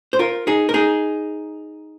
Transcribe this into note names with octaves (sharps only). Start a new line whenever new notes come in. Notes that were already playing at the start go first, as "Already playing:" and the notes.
C5
F4 A#4
D#4 G#4
A#4
D#4 G#4